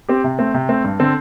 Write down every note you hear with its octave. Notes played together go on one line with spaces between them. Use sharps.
C4 G4
C3
A3 C4
C3
A3 C4
G2
D3 C4 A4